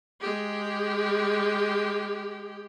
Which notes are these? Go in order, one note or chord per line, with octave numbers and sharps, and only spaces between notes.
G#3 G4